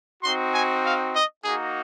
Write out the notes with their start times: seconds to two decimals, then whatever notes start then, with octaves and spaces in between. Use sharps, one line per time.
0.23 C4 D#4 F#4 C6
0.54 G#5
0.84 F5
1.14 D#5
1.44 A#3 D#4 F#4 G#4